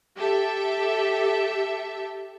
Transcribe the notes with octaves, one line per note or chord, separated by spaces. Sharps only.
G4 A4 E5